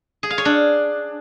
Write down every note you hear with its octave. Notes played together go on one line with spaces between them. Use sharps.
G#4
F5
C#5
D4